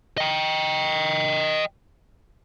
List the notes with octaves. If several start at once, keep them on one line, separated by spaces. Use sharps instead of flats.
D#5 G5